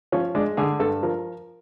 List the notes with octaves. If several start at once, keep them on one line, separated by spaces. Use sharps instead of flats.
F3 C#4
G#3 D4
D3 G#4
G2 A4
F3 A#4